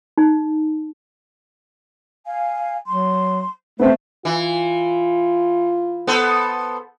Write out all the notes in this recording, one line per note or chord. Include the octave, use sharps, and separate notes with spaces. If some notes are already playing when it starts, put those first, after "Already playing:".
D#4
F5 G#5
F#3 C6
A3 B3 C4 C5 E5
E3 F4
B3 A4 C5